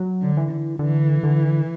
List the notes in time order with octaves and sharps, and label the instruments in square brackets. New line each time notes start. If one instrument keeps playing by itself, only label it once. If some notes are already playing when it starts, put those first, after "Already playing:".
Already playing: [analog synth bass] F#3
[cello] D3
[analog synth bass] E3
[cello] D3
[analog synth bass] D3 [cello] E3
[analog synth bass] D3